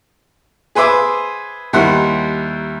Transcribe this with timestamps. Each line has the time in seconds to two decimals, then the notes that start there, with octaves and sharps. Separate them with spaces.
0.75 G#4 B4 C5 E5 D6
1.73 D#2 G3 E4 A#4 C5 F#5